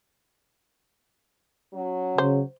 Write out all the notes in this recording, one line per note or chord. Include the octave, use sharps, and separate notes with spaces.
F#3 C#4
C#3 C5